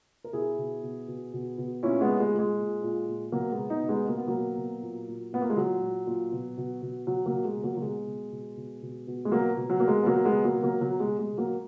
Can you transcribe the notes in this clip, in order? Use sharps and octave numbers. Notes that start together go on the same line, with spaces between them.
A#4
B2 E4 G#4
B2
B2
B2
B2
B2
A#2 C#4 E4
G#3 B3
A#2
G#3
A#2
G#3
A#2
A#2
A#2
B2 F#3 A#3
G#3 B3
B2
B3 D#4
B2
G#3 B3
B2 A#3
B3
B2 F#3 A#3
B2
A#2
A#2
A#2 B3
A#3
G#3
A#2 F#3
A#2
A#2
B2
B2
B2
B2 F#3
F#3 A#3
B2
G#3
B2
F#3 A#3
F#3
B2 G#3
B2
B2
B2
B2
B2
G#3
B2 F#3 A#3
B2
F#3
B2 A#3
G#3
B3
B2 F#3 A#3
G#3 B3
B2
F#3 A#3
B2
F#3 A#3
B2 F#3
G#3
B2
G#3
B2
F#3 A#3